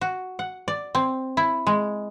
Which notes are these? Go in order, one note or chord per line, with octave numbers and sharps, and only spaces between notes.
F#4
F#5
D5
C4
E4
G#3